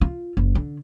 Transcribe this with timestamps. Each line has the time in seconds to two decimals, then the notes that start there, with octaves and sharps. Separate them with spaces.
0.01 F4
0.37 F#1
0.55 D3